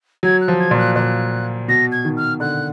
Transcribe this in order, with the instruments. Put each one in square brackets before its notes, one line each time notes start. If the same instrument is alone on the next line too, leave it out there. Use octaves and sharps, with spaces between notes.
[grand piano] F#3 [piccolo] G#6
[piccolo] F#6
[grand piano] F3
[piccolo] G#6
[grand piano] A#2
[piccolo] F#6
[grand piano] A#2 [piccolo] F#6
[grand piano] B2 [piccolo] A#6
[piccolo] G#6
[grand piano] D#3
[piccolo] F6
[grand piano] D3 [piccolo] F#6